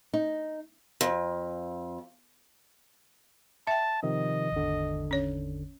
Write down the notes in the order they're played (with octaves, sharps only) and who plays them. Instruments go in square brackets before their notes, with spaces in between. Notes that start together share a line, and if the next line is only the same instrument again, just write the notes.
[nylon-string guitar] D#4
[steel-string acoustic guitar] F2
[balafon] E5 G5 [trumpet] A5
[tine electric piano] C3 D#3 F3 [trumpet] D#5
[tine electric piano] G#1 E2 D3
[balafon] C#4 C#5